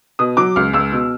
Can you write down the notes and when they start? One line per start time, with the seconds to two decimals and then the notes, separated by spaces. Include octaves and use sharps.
0.19 B2 D#6
0.37 F#3 D6
0.56 C#2 F6
0.73 C#2 E6
0.92 B2